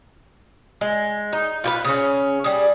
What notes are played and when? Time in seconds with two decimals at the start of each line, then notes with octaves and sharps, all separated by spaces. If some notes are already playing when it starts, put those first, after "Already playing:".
0.81 G#3
1.33 D#4
1.64 F4 G4 B4
1.85 C#3 C#4
2.44 G3 G#4